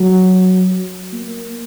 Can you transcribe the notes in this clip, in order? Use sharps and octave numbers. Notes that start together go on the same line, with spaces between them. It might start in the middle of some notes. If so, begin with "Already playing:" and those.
Already playing: F#3
A#3